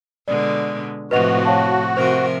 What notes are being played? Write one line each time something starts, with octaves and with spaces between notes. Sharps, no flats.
B2 D3 G#3 D5
A2 C3 F3 F#4 B4 D#5 F7
C#5 F5 A5
C3 F3 A#4 C5